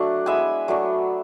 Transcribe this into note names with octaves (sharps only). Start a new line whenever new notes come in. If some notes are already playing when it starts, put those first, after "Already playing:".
Already playing: F#3 A3 D4 F#5
G#3 B3 E4 E5 G#5
F#3 A3 D4